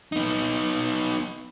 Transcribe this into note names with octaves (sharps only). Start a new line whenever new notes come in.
B3 D#4